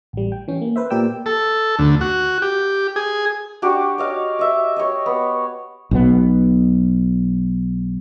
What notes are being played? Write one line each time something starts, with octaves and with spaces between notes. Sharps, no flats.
A1 G3
G5
E3 C#4
A#3
B4 C5 E5
A#2 G4 A#4 D5 G5 E6
A4
D2
F#4
G4
G#4
D4 F#4 G4 C#6
C#5 D#5 F5
D#5 E5
C#5 D#5
B3
B1 B2 B3